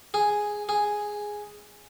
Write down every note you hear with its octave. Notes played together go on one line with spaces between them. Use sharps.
G#4
G#4